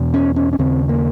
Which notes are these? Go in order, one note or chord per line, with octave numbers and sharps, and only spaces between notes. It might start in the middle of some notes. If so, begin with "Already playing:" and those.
Already playing: E2 B2
C#4
C#4
C#4
D#2 C#3 C4
A#3